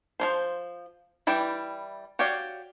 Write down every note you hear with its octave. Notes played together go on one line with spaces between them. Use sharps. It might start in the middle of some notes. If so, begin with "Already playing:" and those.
F3 A#3 C5
E3 G3 E4 G5
F#4 G4 C#5 D5 F5